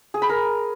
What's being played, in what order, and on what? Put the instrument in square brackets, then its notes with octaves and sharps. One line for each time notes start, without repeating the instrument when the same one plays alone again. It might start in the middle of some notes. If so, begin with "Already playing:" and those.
[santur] G#4
B5
A#4